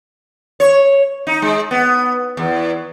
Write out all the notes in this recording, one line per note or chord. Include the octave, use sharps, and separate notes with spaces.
C#5
D#4
G#3
B3
E2